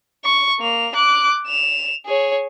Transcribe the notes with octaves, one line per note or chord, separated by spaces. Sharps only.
C#6
A#3 F7
D6 F#6
E7 F7
G#4 C#5